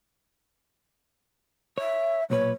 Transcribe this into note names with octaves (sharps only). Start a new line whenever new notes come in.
C#5 E5
B1 A#2 B4 C#5